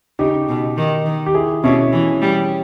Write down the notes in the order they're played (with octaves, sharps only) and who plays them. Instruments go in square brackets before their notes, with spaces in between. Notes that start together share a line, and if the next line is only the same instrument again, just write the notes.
[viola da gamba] C#3 [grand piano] D#4 G4
[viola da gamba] B2
D#3
D#3
[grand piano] G4
E4 G#4
[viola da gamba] B2 [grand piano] C#4 E4
[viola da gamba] E3
G3